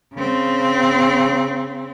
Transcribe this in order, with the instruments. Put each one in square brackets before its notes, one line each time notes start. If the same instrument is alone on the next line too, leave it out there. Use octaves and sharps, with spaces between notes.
[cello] C#3 C4